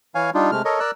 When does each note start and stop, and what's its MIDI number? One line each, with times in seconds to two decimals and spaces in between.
0.15 0.30 52
0.15 0.30 73
0.15 0.30 77
0.15 0.30 80
0.34 0.51 55
0.34 0.51 62
0.34 0.51 63
0.34 0.51 65
0.51 0.62 48
0.51 0.62 56
0.51 0.62 57
0.51 0.62 89
0.65 0.80 69
0.65 0.80 70
0.65 0.80 73
0.65 0.80 75
0.80 0.91 70
0.80 0.91 74
0.80 0.91 88
0.80 0.91 90